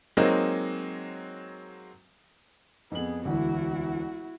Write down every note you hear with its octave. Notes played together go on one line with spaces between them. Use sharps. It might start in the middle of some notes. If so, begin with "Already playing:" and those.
F#3 G#3 A#3 C4 D#4
F2 B3 G#4 F#7
E1 D2 E3 E4 F#4